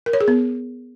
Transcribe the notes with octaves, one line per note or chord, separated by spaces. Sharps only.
A#4
C#5
G#4
B3